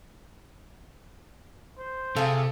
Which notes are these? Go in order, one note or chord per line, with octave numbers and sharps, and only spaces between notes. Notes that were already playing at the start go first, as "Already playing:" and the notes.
C5
C3 F4 G#4 A4